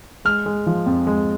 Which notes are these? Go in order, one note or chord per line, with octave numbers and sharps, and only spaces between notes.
G#3 F6
G#3
F3
F2
G#3